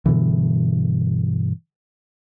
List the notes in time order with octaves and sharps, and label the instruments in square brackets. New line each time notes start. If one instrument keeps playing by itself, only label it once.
[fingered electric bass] G2 B2 D3 E3